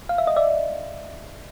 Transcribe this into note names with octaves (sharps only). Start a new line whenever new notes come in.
F5
E5
D#5
D5 E5